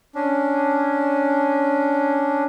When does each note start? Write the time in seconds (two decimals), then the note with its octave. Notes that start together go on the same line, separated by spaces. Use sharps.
0.15 C#4 D4